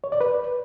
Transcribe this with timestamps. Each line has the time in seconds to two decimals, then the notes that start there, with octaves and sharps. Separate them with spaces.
0.04 C#5
0.12 D5
0.21 B4